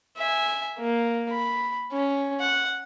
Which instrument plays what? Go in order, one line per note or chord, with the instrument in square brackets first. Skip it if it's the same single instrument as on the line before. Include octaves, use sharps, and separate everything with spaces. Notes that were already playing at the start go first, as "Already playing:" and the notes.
[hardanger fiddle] E5 G#5
A#3
B5
C#4
F#5